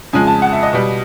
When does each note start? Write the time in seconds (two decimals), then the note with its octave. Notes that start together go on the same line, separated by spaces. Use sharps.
0.13 F2 C#3 F3 G#3 G#5
0.27 A5
0.42 F#5
0.52 E5
0.63 D#5
0.73 B2 G3